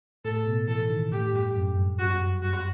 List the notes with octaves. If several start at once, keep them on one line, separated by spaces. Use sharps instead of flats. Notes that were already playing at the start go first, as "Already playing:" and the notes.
A2 A4
B2
E3 A4
D#3
A2 G4
G2
F#2
G2
F#2 F#4
G2
F#2 F#4